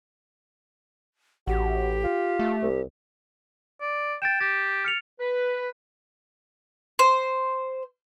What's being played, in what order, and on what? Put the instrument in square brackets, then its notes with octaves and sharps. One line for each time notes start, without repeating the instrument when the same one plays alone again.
[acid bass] A1 [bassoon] F#4 [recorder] G4
[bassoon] F4
[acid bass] A3
[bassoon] C2
[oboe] D5
[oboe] G5 [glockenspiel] A6 D7 E7
[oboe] G4 [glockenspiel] A6
[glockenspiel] F6 C#7 F7
[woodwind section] B4
[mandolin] C5